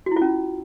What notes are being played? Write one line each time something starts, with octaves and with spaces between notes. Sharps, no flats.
F#4
E4
F4
C#4